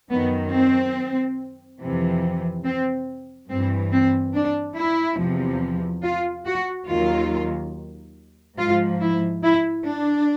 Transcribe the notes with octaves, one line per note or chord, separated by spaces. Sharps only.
F#2 D#3 F#3 B3
C4
F2 C3 E3
C4
G2 E3 C4
C4
D4
E4
E2 C3 F3
F4
F#4
D#2 D#3 F#3 F4
G#2 F3 F4
E4
E4
D4